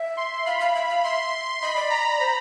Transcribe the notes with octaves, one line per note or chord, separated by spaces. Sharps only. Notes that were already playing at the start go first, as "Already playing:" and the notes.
Already playing: E5
C6
F5 B5
F5
E5
F5
E5 C6
D#5 B5
D5
A#5
C5